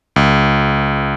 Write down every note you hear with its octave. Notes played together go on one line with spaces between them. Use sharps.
C#2